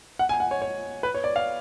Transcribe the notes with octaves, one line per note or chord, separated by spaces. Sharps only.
F#5
G#5
F#5
C#5
C#5
B4
C#5
D5
F5